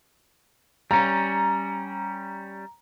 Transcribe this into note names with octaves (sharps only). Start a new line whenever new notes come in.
G3 C#4 A#5